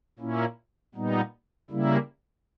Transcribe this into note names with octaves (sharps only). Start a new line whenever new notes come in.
A#2 A#3 C#4 E4
A#2 G3 B3 D#4
C#3 G3 A#3 E4